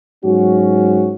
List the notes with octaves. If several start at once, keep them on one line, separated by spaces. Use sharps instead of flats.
G#2 F#3 C#4 F#4